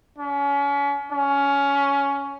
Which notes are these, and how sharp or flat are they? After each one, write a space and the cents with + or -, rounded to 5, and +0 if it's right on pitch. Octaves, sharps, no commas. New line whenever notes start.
C#4 +35
C#4 +15